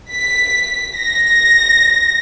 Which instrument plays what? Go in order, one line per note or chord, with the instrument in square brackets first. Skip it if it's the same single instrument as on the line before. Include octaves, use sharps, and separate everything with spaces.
[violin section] B6
A#6